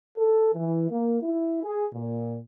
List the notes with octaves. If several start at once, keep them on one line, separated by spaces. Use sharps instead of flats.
A4
E3
A#3
E4
G#4
A#2